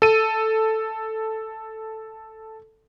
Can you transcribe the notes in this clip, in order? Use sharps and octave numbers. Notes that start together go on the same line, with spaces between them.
A4 D#7